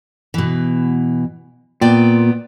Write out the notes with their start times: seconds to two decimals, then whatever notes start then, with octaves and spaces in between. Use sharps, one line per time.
0.34 B2 E3
1.81 A#2 B3 D5 G5